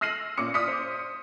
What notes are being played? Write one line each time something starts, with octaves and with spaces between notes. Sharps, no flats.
E6 F6 A#6 C7 D#7 F#7
A#2 C#4 D6 C#7
D5 D#6 F6 B6 C#7
C5